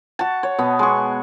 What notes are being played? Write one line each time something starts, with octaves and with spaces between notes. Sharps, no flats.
F#4 A5
C#5
B2 B3
G#3 C#6